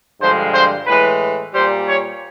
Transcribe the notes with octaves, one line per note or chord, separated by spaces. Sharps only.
G2 D3 F3 G#3 C5
C5
A2 E3 G#3 B4
A#2 G3 C5
C#5